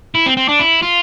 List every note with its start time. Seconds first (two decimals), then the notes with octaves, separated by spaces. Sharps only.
0.15 E4
0.26 C4
0.37 C4
0.49 D4
0.60 E4
0.83 F4